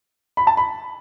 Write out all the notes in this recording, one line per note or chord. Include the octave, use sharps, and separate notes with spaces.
B5
A5
B5